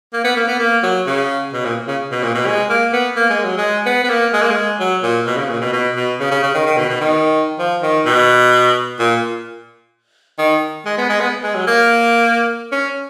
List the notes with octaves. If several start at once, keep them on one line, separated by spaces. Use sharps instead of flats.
A#3
B3
A#3
B3
A#3
F#3
C#3
B2
A#2
C#3
B2
A#2
B2
G#3
A#3
B3
A#3
G#3
F#3
G#3
B3
B3
A#3
G#3
A#3
G#3
F#3
A#2
B2
C#3
A#2
B2
B2
B2
C#3
C#3
C#3
D#3
D#3
B2
B2
D#3
F3
D#3
B2
A#2
D#3
G#3
B3
G#3
B3
G#3
F#3
A#3
C#4